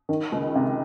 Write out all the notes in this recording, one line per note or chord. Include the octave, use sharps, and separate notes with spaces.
D#3
C#2
C3